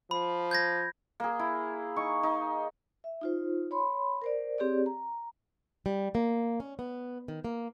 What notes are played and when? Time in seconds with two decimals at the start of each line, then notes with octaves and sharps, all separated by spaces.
0.11 F3 B5
0.51 G6 G#6 A#6
1.20 A#3 G#4
1.39 E4
1.96 D#4 C#6
2.23 D#4
3.04 E5
3.21 D#4 F4 C5
3.71 C#5 B5 C6
4.22 A#4 C5 D5
4.58 C4 G4 G#4 C#5 D5
4.86 A#5
5.86 G3
6.15 A#3
6.60 C#4
6.79 B3
7.28 D#3
7.45 A#3